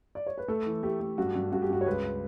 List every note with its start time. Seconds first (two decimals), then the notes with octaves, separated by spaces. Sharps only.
0.15 D5
0.26 C#5
0.38 B4
0.48 A3 A4
0.66 E3
0.83 A3 G4
1.00 A3
1.18 G2 F#4
1.35 G2
1.52 G2 F#4
1.62 G4
1.69 G2 F#4
1.81 C#5
1.86 C#2 B4